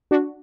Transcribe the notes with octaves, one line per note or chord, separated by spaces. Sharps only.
D4 F#4